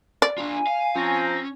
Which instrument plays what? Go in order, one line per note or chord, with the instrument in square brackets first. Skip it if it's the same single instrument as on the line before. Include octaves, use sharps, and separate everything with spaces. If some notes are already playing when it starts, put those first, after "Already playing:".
[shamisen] D5
[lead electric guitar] D4 F4 [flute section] G#5
[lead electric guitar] F5
[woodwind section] F3 C4 A#5 [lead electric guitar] C#4